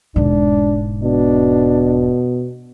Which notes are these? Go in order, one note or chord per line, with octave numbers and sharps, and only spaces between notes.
E1 G#2 D4
B2 D4